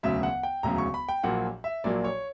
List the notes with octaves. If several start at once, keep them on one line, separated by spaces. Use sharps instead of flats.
E1 D2 C#3 F#3 E5
F#5
G5
E1 D2 C#3 F#3 A#5
C#6
B5
G5
A#1 A#2 F#3 A#3 F#5
E5
A#1 A#2 F#3 A#3 D5
C#5